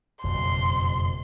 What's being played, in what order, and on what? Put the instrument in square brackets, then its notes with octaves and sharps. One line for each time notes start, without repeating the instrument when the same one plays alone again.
[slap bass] F#1 F2 B2 [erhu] C6